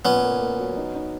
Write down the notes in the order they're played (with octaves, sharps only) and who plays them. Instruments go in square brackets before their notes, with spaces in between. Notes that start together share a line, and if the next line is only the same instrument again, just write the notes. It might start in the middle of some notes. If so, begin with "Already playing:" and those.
[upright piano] A#2 [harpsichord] B3 C#4
[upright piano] A#3
A#3
F#3
D#4
D#4